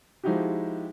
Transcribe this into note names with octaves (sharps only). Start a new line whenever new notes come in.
F3 G#3 D#4 E4 F#4 G4